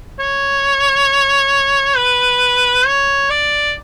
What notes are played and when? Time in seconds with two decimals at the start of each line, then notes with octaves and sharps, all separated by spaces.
0.19 C#5
1.97 B4
2.86 C#5
3.30 D5